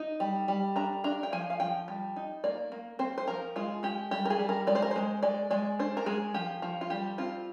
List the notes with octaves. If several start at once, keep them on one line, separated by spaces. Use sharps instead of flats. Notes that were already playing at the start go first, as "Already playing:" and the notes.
Already playing: D#4
G3
G3
D4 A#5
D4 A#5
G5
F3 G#5
F5
F3 G5
G3
D#4
A#3 D5
A#3
C4 C5
C5
F3 A#4
G#3 F4
G#3 G4
G3 G4
A#4
G#4
G3
A#4
G#3 D5
C5
A#4
G#3 C5
G#3 D5
G#3 D5
D4 C5
A#4
G#3 G#4
F3 G4
F3
F4
G3 G4
C4 F4